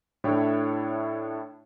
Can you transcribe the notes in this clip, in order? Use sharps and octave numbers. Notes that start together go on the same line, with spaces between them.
A2 D4 E4 A4 C#5 G5